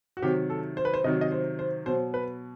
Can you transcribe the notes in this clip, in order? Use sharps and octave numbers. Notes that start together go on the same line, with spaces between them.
F#4
C3 D#3 F#3 G4
A4
C5
B4
C5
C3 D#3 F#3 D#5
D#5
C5
C5
B2 F#3 C5
B4